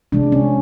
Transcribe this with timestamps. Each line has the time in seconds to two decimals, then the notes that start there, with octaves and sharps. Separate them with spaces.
0.12 C3 F3 G#3 D4
0.32 C#4